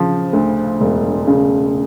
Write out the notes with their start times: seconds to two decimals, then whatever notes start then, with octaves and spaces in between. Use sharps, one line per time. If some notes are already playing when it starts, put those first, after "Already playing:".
Already playing: C#3 F3
0.33 D2
0.81 E1
1.27 C#3